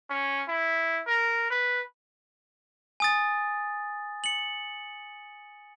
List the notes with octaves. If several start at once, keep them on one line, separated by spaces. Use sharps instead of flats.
C#4
E4
A#4
B4
G#5 D#6 A6
C#7 F#7